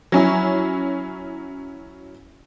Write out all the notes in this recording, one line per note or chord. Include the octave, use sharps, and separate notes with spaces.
F#3 C#4 E4